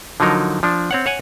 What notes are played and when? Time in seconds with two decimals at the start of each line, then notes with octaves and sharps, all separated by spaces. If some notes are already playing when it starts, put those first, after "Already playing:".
0.20 D3 F3 F#3 D#4 A#4
0.63 F3 D4
0.91 C4 C#5 F#5
1.06 C#5 F#5 G#5